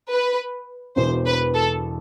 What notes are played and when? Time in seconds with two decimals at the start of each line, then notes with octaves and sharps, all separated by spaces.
0.10 B4
0.96 E1 E2 B2 C5
1.26 B4
1.54 A4